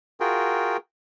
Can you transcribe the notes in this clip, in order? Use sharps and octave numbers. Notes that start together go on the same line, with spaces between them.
F4 F#4 G#4 A#4 G5